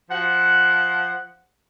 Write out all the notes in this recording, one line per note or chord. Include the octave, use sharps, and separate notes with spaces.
F3 F#5